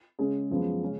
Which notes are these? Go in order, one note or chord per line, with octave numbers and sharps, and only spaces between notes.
C#3 G#3 C#4 G#4
F#2 F3 G#3 B3
C#3 G#3 C#4